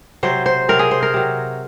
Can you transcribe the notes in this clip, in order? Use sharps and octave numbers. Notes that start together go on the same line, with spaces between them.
C3 F#3 C5
C5
C3 F#3 A#4
G#4
C5
A#4
C3 F#3